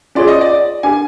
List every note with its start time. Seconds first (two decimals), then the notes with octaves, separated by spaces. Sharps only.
0.15 C#4 F4 G#4 C#5 D5
0.28 D#5
0.41 D5
0.83 D4 G4 A#4 G#5